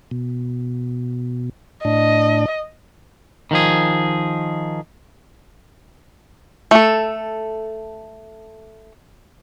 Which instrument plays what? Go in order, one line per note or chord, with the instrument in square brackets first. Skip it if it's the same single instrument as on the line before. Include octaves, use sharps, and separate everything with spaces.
[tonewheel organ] B2
[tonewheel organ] A2 D4 [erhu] D#5
[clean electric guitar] D#3 F3 G#4
[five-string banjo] A3 A4